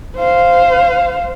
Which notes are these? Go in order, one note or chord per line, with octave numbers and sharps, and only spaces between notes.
C5 F5